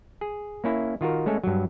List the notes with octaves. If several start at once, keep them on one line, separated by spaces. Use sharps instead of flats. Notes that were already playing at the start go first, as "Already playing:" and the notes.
G#4
A#3 C#4 E4
D#3 F4 F#4 A#4
G#3 A3 C#4 A4
G2 F#3